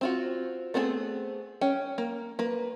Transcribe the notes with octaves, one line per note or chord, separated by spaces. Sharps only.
C4 F4 F#4
A3 B3 C4 F4 G#4
C#4 G5
A#3
A#3 B4